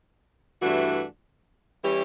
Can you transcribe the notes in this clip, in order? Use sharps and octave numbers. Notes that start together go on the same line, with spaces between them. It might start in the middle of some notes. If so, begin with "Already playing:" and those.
G2 E3 A3 D4 F#4
E3 G3 C#4 E4 G4